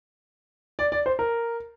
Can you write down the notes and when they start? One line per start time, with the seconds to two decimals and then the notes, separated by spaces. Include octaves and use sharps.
0.79 D5
0.92 D5
1.06 C5
1.19 A#4